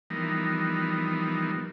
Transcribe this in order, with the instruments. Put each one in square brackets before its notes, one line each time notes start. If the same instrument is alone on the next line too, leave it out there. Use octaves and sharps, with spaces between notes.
[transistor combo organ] E3 F3 G3 B3 D#4 A#4